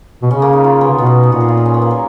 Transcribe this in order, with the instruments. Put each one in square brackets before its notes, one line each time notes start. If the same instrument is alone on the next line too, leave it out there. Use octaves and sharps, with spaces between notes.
[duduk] B2
[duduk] C#3 [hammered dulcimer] C#4
[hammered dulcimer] A#3
D#4
F4
B3
[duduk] C#3
[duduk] B2 [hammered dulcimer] B3
[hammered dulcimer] C#4
D#4
[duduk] A#2 [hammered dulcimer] F#4
[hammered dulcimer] G#4
F4
D#4
C#4
B3
A#3
F#3